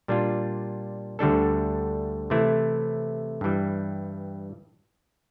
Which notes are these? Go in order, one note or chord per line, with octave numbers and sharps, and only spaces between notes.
A#2 G3 D4 F4
D2 D3 G3 D4 A4
C3 E3 A3 E4
G2 E3 G3